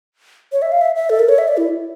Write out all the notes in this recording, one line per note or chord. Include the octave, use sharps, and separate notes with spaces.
C#5
E5
F5
E5
E5
A4
A#4
C#5
E5
D5
E4